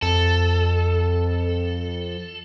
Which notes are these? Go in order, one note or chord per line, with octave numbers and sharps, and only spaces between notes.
F2 A4